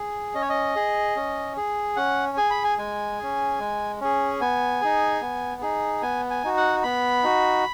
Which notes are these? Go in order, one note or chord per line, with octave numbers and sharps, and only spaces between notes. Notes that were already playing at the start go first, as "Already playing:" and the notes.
Already playing: G#4
C#4 D#5
C#5
D#5
G#4
C#4
G#4
C#4 F#5
G#4 G#5
B5
G#5
G#3 G#5
C#4 G#4
G#3
C#4 G#4
B3 G#5
D#4 G#4
B3
D#4 G#4
B3 G#5
G#5
D#4 F#4
F#5
B3 B5
D#4 F#4